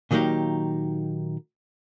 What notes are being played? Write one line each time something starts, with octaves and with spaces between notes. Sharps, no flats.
A#2 D#3 F#3 A#3 D#4 G4